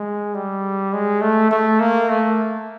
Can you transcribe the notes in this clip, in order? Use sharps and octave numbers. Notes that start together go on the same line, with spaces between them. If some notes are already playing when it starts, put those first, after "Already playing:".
Already playing: G#3
G3
G#3
A3
A3
A#3
A3